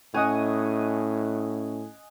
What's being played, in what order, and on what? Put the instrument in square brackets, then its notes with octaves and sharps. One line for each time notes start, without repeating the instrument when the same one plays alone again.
[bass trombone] A2 [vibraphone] C#4 [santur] D#5 F#5 G#5